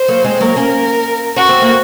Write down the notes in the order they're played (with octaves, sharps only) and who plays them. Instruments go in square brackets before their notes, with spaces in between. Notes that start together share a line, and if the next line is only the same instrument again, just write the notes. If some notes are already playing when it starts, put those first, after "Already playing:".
Already playing: [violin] C5
[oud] F#3 A#3
G#3 C4
[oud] F#3 A#3 [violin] A#4
[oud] A#3 C#4
[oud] C#4 [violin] F#4
[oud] C4
A#3